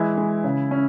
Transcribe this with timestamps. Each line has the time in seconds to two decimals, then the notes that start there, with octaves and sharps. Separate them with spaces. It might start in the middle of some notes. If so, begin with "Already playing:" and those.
Already playing: E3 G#3 E4
0.18 G#3
0.44 C#3
0.71 C#4